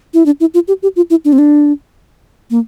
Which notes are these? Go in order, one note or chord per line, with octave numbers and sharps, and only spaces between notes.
E4
D4
E4
F4
G4
G4
F4
E4
D4
C4
D4
A#3